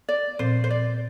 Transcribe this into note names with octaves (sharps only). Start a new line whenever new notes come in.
D5
A#2 F3 C4 C5
C5
D5